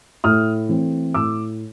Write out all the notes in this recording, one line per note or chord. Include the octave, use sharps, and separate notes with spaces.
A2 D#6 F6
E3 A3 C4
A2 D6 E6